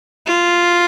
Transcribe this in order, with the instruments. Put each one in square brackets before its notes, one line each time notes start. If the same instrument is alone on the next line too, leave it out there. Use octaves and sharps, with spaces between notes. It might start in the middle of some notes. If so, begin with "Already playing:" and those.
[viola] F4